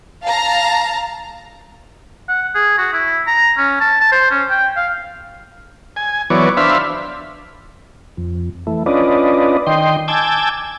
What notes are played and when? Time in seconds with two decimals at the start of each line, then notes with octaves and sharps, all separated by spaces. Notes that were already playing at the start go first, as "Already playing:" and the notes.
0.23 F5 A5 A#5
2.29 F#5
2.55 G#4
2.78 F#4
2.93 E4
3.27 A#5
3.58 C#4
3.81 A5
4.00 A5
4.12 C5
4.31 C#4
4.50 G5
4.77 F5
5.96 G#5
6.30 E3 F#3 B3 C#5 D5
6.57 D4 C5 E5 F5 B5
8.17 F2
8.67 E3 A3
8.86 C#4 D4 F4 B4 D5 D#5
9.67 D#3 D#5 G5 C6
10.08 G#5 A5 D6 E6 G6 G#6